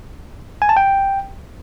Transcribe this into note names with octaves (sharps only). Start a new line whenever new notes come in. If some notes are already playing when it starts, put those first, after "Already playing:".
G#5
A5
G5